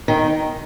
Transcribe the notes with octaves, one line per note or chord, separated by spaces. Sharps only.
D#3